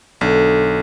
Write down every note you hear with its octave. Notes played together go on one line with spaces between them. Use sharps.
B1 D3